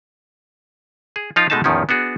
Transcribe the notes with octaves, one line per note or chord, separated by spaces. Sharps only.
G#4
F3 D#4 F4 F5
B2 G#3 A3 D#4 E5 A5
E2 A2 D#3 F3 C#4
B3 D4 F#4 G#4